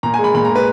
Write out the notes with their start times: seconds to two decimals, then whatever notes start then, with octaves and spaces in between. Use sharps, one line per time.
0.03 A#2 A#5
0.14 G#5
0.19 G#3
0.24 B5
0.34 A#2 B5
0.45 A#5
0.50 G#3
0.56 B4